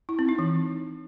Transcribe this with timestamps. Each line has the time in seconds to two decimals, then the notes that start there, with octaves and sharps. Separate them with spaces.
0.09 E4
0.19 C4
0.29 D#4
0.39 E3